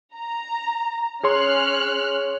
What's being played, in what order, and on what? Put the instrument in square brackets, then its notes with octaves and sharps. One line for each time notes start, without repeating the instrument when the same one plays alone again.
[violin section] A#5
[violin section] C#4 F6 F#6 [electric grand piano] G#4 C#5 C6